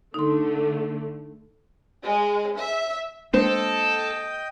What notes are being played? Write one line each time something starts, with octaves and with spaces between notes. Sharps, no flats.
D3 A3 D#4 C6
G#3
E5
G#3 A#3 D4 A4 C5 D#5 G5